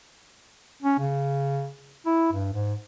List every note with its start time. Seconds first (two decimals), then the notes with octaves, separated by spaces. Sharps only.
0.83 C#4
0.99 C#3
2.06 E4
2.33 G2
2.54 G#2